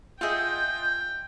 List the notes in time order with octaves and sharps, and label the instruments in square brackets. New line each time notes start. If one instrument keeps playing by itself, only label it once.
[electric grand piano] F4 D#5 [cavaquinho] G#4 E5 F#5 [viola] G5 [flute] G6